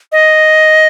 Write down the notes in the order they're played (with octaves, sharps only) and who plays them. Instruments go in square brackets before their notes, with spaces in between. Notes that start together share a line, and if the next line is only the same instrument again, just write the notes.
[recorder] D#5